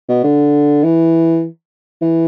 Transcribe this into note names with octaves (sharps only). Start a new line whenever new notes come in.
B2
D3
E3
E3